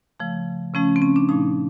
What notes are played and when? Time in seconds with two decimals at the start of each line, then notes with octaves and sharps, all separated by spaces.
0.20 C#3 F3 A3
0.74 C#3 F3 A3 C#4
0.96 C4
1.02 C#4
1.16 D4
1.29 A#2 F3 A3 D#4